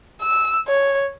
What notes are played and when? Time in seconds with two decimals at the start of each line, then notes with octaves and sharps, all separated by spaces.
0.21 E6
0.68 C#5